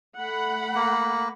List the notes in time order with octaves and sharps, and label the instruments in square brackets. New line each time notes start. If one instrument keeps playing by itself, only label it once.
[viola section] A3 F#5 B5
[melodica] A#3